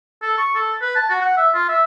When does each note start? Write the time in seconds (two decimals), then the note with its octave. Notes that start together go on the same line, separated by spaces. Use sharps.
0.22 A4
0.38 C#6
0.55 A4
0.82 B4
0.95 A5
1.10 F#4
1.21 F#5
1.37 E5
1.54 F4
1.69 E5